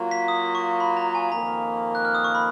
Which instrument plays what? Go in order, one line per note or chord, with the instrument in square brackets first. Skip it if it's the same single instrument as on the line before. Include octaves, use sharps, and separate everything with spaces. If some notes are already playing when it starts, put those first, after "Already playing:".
Already playing: [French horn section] F#3 A#3 F4
[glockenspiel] B6
D#6
C#6
B5
A#5
G#5
[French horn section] F2 D#3 A#3 [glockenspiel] A#5
[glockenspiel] F#6
F6
D#6
C#6
B5